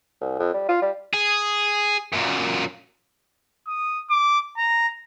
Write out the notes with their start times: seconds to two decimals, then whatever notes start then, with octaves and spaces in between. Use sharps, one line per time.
0.21 C2
0.39 F2
0.54 G3
0.68 F4
0.82 G3
1.14 G#4
2.13 F#2 A#2
3.68 D#6
4.10 D6
4.57 A#5